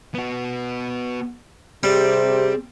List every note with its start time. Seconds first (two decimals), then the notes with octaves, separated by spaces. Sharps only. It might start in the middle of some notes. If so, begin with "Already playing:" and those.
0.14 B3 F#4
1.83 C3 G3 C4 G#4